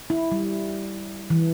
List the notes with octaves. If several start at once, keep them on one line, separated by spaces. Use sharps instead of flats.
E4
G3
E3